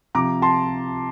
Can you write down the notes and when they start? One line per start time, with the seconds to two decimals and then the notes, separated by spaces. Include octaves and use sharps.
0.15 C3 F3 A#5 D6
0.42 A5 C6